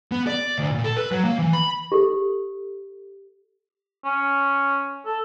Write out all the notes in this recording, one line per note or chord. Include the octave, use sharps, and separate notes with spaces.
B3
D5
D2
A#2
A4
B4
F#3
A#3
E3
B5
G4 A4
C#4
A4